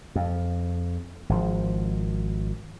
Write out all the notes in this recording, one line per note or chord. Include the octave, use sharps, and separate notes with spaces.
F2
G#1 F3